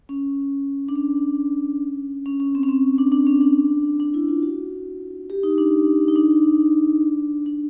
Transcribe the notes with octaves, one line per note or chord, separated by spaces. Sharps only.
C#4
D4
C#4
C#4
C#4
C4
C#4
C4
D4
D4
C#4
D4
D4
E4
F4
F#4
G4
D#4
D4
D#4
D4
D4